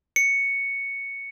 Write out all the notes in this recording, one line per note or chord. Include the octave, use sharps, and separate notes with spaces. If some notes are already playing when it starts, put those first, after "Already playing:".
C#7